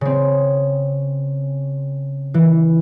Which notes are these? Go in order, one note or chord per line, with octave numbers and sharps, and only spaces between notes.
C#3 C4
E3